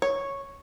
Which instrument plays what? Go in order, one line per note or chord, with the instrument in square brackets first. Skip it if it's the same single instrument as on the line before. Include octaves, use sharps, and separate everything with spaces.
[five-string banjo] C#5